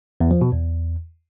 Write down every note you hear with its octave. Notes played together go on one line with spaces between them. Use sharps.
E2
F3
B2
E2